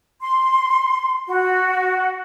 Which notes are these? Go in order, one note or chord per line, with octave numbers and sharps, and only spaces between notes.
C6
F#4